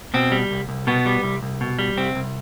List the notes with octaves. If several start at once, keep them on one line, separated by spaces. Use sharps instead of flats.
B2 C4
G3
C2
C2
B2 B3
G3
C2
C2
B2
G3
C2 C4
C2